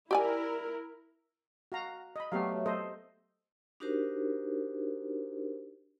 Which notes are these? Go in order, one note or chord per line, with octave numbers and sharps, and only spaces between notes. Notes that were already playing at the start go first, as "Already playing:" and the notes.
E4 G4 A#4 D5 G#5
F#4 F5 A#5
D#5 B5
F#3 A3 B3 G4 F5
A4 C5 D#5
D4 D#4 F#4 G4 A#4 C5